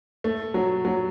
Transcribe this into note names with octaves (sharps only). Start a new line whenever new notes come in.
A3
F#3
F#3